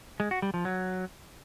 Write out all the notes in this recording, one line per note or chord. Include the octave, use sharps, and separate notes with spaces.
G#3
F#4
G3
F3
F#3